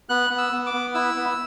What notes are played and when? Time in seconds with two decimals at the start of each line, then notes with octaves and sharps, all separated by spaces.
0.09 B3 F#6
0.30 B3
0.38 E6
0.52 B3
0.66 D6
0.74 B3
0.95 E4 E6
1.16 B3